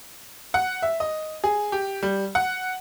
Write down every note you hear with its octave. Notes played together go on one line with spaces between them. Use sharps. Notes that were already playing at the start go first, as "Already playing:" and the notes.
F#5
E5
D#5
G#4
G4
G3
F#5